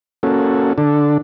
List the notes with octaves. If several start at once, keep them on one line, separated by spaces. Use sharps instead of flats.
A#3 C#4 F#4 A4
D3 D4 A4